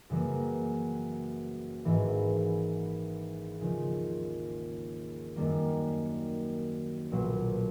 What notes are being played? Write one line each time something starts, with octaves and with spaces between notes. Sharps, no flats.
F#2 C#3 E3 G3 A#3
G#1 G#2 E3
D#2 C#3 F3
F#2 D#3 G3 A#3
B1 A#2 F#3